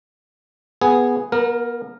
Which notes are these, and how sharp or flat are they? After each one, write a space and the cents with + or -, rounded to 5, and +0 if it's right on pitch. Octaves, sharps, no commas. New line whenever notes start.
B3 +0 G#4 +0
B3 -40 A#4 +0